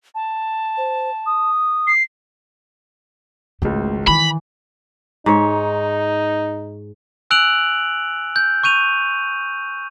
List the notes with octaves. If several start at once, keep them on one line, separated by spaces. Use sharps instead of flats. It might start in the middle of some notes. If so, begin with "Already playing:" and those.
A5
C5
D#6
C7
G#1 C#2 C#3 A3
D#3 E3 B5
G#2 D#4 C#5
G#5 E6 F#6 D7 F7 F#7
G6
C#6 G6 D#7 F7